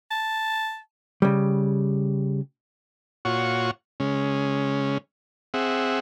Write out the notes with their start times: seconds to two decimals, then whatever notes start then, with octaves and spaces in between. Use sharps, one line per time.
0.11 A5
1.22 C#3 G3
3.25 A#2 F4 F#4 C#5 F#5 C#6
4.00 C#3 G#3 C#4
5.54 C4 G#4 E5 F#5